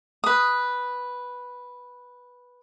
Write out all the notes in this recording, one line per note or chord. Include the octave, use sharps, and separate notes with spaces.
B4 D#6